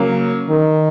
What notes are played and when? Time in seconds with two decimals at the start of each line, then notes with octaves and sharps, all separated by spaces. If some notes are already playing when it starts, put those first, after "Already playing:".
Already playing: C#3 F#3 A#3
0.49 D#3